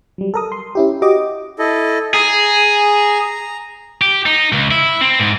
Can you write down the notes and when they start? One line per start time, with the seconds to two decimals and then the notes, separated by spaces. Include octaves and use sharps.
0.18 F#3 G3
0.34 A4 A#4 D#6
0.52 C6
0.75 C#4 E4 G4
1.02 F#4 G4 D#5 D6
1.59 E4 A4 D#5
2.14 G#4 A#5
4.02 G4
4.26 D#4
4.53 C#2
4.71 E4
5.01 C4
5.20 G#2